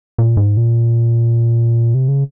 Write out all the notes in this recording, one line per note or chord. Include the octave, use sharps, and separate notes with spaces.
A#2
G#2
A#2
C3
C#3